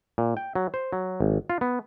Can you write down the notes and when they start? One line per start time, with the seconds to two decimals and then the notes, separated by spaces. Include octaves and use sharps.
0.18 A#2
0.37 G5
0.55 F#3
0.74 C5
0.93 F#3
1.20 G#1
1.50 F4
1.61 B3